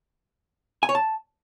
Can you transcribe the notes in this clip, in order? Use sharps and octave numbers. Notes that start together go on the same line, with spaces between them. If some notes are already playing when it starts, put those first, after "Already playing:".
G#5
C#5
A5